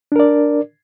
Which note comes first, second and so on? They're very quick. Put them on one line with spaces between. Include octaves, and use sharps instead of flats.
D4 A#4 D5